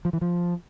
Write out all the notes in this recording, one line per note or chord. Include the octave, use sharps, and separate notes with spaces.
F3
E3
F3